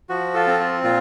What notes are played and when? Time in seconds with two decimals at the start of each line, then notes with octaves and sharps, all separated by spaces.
0.09 F3 F#4
0.34 F4 A4
0.47 C4
0.60 F4
0.83 A#2 F4